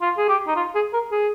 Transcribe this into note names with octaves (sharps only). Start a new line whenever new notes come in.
F4
G#4
G4
D#4
F4
G#4
A#4
G#4